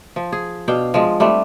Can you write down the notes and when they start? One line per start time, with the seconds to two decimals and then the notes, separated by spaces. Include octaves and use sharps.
0.16 F3
0.32 G#4
0.68 B2 D4 F5 G5
0.94 F3 G#3
1.20 G3 A3 C4 D4